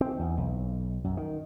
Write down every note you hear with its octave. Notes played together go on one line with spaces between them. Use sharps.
C4
E2
B1
F#2
D#3